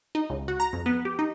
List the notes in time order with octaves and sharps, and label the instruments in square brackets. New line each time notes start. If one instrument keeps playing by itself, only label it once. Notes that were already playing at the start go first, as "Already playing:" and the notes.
[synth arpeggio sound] D#4
C#2
F#4
A#5
F2
B3
G4
D#4